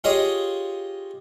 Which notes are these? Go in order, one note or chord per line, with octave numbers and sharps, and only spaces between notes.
F4 G4 G#4 C#5 D#5